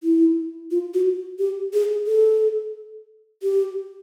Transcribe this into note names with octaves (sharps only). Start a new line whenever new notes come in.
E4
F4
F#4
G4
G#4
A4
G4